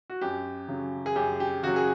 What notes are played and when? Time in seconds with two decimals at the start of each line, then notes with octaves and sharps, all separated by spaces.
0.10 F#4
0.21 F#2 G4
0.68 C#3 F#3
1.06 G#4
1.16 F#2 G4
1.40 G4
1.63 C#3 F#3 F#4
1.76 G#4